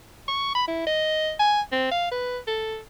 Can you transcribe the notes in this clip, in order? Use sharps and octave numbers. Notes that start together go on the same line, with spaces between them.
C#6
B5
E4
D#5
G#5
C4
F5
B4
A4